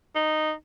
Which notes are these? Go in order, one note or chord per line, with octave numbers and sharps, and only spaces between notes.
D#4